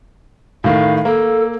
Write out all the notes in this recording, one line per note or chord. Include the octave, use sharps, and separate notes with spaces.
A2 D#3 F5
A#3 A4